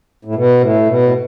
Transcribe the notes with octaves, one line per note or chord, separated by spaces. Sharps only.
A2
B2
A2
B2
A2